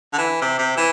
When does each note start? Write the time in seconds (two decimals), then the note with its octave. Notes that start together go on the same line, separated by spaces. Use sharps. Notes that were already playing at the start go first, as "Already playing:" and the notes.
0.13 D3
0.18 E3
0.41 C3
0.59 C3
0.77 E3